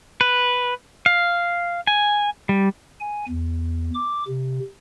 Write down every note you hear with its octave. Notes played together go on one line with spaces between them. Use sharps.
B4
F5
G#5
G3
G#5
E2
D6
C3